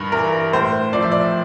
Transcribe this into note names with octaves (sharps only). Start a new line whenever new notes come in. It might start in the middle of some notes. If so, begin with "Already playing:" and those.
Already playing: G2 A#4
E3 A#4
A2 C5
F3 D5
E5
D5